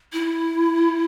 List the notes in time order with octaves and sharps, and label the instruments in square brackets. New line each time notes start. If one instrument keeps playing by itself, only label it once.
[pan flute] E4